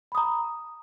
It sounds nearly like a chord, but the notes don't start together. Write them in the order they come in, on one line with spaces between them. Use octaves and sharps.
B5 D#6 A#5